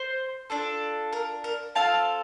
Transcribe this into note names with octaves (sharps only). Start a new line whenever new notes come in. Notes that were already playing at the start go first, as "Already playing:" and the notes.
Already playing: C5
D4 F4 A4
A#4
A#4
C4 F4 A4 F5 A5